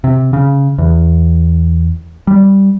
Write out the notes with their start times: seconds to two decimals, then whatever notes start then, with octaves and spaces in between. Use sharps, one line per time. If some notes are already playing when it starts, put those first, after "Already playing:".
0.04 C3
0.33 C#3
0.78 E2
2.27 G3